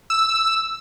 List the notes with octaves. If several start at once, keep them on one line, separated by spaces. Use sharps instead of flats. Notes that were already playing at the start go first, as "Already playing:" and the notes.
E6